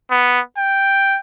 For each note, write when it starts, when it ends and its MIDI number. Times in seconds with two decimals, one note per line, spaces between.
0.11 0.40 59
0.57 1.19 79